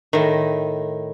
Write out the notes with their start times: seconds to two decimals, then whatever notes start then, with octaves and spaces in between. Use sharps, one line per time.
0.13 A2 D#3